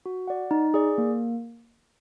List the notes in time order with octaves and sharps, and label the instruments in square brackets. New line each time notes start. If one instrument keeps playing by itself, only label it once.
[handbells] F#4
D5 F#5
D#4
G#4 D5
A#3